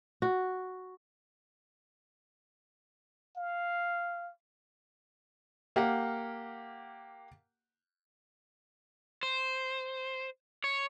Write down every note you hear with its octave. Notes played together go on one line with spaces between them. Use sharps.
F#4
F5
A#3 G4 F5 F#5
C5
C#5